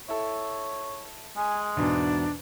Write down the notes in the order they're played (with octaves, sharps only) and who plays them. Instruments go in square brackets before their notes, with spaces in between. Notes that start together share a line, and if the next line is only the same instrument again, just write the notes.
[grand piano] E4 A4 [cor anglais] C#5
[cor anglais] G#3 [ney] G#5
[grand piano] E2 G#2 B2 [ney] D4